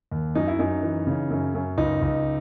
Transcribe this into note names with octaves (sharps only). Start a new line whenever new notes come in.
D#2
F#2 D#4
E4
F#2 D#4
E3
C#3
F#2
F#2
C#2 D#4
C#2